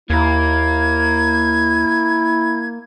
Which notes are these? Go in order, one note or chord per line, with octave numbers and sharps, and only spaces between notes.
D#2 A#3 E4 A#4 G#6